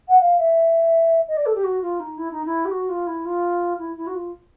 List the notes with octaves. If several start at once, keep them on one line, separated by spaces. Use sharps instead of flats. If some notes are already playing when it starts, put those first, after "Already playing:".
F#5
F5
E5
D#5
D5
A4
G4
F#4
F4
D#4
E4
D#4
E4
G4
F#4
F4
E4
F4
E4
E4
F#4
F4